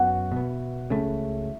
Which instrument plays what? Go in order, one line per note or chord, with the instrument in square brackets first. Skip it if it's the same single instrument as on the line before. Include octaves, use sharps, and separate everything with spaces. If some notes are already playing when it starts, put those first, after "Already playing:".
Already playing: [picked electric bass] F#2 F#3 B3 [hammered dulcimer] E4 F#4
[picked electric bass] B2 B3
[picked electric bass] C#2 C#3 A3 [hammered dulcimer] E4